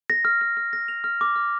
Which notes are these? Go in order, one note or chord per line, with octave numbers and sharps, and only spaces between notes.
A#6
F6
F6
F6
A#6
F7
F6
D6
F6